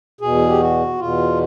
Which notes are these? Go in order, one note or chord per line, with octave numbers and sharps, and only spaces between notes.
E2 B2 G#4
G4
F#4
E2 B2 F4